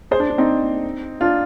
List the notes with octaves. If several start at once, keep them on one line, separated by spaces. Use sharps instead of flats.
G#4 C5
D4
D4
C4 D#4
D4 F4